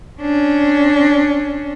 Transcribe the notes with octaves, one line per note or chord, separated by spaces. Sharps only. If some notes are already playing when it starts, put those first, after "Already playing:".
C#4 D4